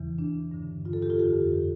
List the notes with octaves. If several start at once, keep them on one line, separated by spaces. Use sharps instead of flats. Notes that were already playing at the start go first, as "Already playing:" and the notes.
Already playing: E2 C#3 E3
D4
G2 D3
F4
A4
G4
F4
F2 D3 G4